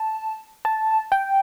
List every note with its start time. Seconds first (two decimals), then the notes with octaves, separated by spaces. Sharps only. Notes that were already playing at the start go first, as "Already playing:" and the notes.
Already playing: A5
0.65 A5
1.12 G5